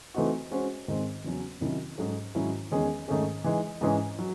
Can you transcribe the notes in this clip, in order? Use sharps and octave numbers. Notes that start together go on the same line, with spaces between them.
E3 A3 C4 D#4 F#4
G#3 C#4 F#4 C5
G#2 D#3 G#3 C4
E2 C#3 F#3 C#4
C3 D#3 F#3 C#4 E4
G#2 F#3 C#4 F#4 A4
G#2 D#3 F#3 C#4 E4
E2 D#3 G#3 C#4 G#4
G#2 D#3 A3 C#4 G#4
E3 G#3 D#4
G#2 E3 G#3 C#4 G#4
F#3